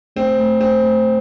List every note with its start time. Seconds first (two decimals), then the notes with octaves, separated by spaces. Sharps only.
0.16 A3 C4
0.39 A3
0.61 A3 C4
0.83 A3